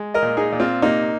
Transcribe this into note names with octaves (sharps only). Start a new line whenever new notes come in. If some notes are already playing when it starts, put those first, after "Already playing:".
Already playing: G#3
A#4 D#5
A#2
D#4 G#4
A#2
C4 F4
C3 A#3 D#4